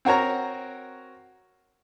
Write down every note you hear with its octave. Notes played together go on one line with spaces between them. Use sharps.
C4 F#4 A#4 C#5 A#5